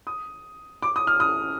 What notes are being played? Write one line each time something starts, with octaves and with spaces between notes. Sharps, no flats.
D#6
D6
D#6
F6
D#6